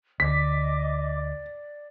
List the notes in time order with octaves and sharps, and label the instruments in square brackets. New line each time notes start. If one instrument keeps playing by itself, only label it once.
[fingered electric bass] D2 [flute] D5 [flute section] D#5 D6 [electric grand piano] B6